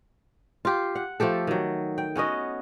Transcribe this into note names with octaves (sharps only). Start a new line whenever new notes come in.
F4 G4
F#5
F3 A3 G4 A4
D#3 F#3
G5
B3 C#4 F#4 D#5